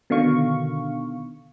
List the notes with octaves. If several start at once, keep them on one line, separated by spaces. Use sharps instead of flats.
B2 D3 D#3 F5 C#6